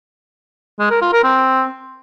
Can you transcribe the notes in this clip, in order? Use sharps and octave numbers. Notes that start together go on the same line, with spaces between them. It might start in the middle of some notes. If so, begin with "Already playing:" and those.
G#3
A#4
F4
A#4
C4